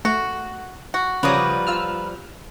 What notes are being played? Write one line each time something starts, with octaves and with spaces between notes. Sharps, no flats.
A3 F#4
F#4
C#3 F3 G3 B4 C#5 D5 A#5 D#6
F4 E6 F6